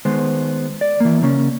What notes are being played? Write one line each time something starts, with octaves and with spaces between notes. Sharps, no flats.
D#3 G#3 B3 C5
D5
E3 A#3
C#3 A#3 C#4